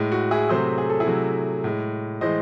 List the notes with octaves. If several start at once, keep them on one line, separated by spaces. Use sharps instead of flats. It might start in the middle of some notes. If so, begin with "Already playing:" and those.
Already playing: A2 G#3
F#4
E4 G#4
C3 F#3 A3 G#4 C5
G#4
A4
E4 G#4
C3 F#3 A3
A2 G#3
A2 E3 G#3 C5 D#5